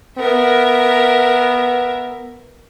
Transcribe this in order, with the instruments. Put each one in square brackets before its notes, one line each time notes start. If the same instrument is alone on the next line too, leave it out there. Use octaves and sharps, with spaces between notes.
[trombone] B3 [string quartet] A#4 E5